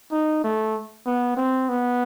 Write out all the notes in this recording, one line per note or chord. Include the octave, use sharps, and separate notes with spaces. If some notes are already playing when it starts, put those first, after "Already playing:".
D#4
A3
B3
C4
B3